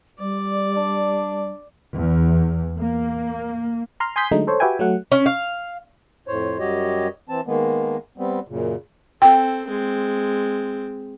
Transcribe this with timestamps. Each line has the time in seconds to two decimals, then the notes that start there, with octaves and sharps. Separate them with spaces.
0.20 G3 D5
0.77 D4
1.97 E2
2.80 A#3
4.00 A#5 C6 F6
4.16 G#5 C6 D#6 G6 B6
4.31 D3 F#3 G#3 A3 D#4
4.47 A4 C5 C#5
4.60 F#4 G4 B4 E5 G5 G#5
4.79 F#3 A3 F#5
5.12 C#4
5.26 F5
6.27 F2 A2 C5 C#5
6.59 F#2 G3 F#4 G4 C#5 D#5
7.29 E3 C4 A5
7.47 D#3 G#3 A#3 B3
8.18 G3 B3 C4
8.48 F#2 A#2 C#3
9.22 C4 A4 G5
9.67 G#3 C4